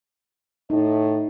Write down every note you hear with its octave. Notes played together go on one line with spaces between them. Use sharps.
A2 D#4 D#5